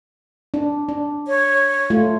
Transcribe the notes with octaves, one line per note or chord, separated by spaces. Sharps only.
D4
D4
C#5
A3 F4